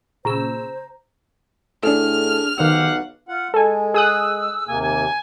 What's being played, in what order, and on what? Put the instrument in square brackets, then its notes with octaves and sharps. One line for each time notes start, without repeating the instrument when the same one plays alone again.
[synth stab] A#2 C#3 E6 [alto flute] C5 [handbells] A#5
[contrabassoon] A2 [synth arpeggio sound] D4 G#4 A4 [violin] F6
[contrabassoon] B1 [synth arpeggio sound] D#3 C5 E6 [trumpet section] G4 F5 F#5
[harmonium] F4 F#5
[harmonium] G#3 [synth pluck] A4 G#5
[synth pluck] G#4 D#6 F#6 [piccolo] E6
[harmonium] D#2 C3 A#3 [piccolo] G#5
[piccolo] G#5